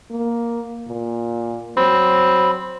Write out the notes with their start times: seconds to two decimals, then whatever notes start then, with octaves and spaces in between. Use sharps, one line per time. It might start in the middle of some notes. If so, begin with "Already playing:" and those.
0.11 A#3
0.88 A#2
1.77 F#3 C4 B5